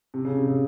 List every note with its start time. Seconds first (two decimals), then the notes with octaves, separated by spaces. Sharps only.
0.14 C3
0.25 C#3
0.37 C3
0.48 C#3